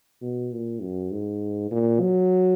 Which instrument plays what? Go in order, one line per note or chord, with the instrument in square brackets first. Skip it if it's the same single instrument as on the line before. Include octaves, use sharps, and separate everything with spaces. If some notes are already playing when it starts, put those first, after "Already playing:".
[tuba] B2
A#2
F#2
G#2
A#2
F#3